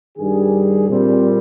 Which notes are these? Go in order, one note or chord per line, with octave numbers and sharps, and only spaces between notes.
G2 D#3 G3 G#4
A#2 G3 C4